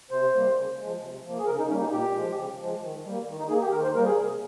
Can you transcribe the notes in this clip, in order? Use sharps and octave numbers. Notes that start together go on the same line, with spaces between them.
C3 C5
G3 A#3
C#3
F3 G#3
C3
F3 A#3
G#4
C#3 A#4
D#4
G3 A#3 C#4
D#4
A#2 G4
F3 G#3
C#3
F3 G#3
D#3
G3 A#3
D#3
D#4
A#3 G#4
G4
D#3 A#4
C5
G3 A#3 A#4
G#4
C3